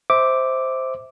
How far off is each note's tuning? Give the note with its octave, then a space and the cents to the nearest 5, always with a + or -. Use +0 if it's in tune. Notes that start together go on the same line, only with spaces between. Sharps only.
C5 +0 E5 -20 D6 +0